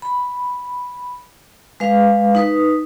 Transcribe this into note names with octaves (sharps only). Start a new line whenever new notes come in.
B5
G#3 B4 F5
D#4 B4 D#6